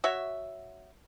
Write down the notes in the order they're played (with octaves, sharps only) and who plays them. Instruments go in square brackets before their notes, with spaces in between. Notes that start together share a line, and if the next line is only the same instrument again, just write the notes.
[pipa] F#4 C#5 E5